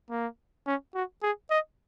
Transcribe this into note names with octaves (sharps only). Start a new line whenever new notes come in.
A#3
C#4
F#4
G#4
D#5